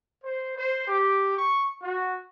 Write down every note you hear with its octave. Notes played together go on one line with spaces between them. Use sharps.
C5
C5
G4
C#6
F#4